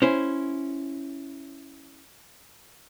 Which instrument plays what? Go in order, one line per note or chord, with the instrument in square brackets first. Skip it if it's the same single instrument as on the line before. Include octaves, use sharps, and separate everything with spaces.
[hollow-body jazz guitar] C#4 E4 C5